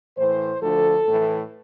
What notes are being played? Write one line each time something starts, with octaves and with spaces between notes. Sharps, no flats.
A2 E3 C5
D2 D3 F3 A4
A2 E3